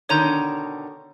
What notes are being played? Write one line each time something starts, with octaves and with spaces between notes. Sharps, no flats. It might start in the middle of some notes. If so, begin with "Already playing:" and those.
B2 D3 D#3 C#5 A#5 G6